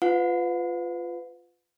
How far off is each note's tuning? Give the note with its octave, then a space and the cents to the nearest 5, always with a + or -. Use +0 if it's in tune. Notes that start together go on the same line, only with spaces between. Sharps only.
F4 +0 B4 +25 F#5 -45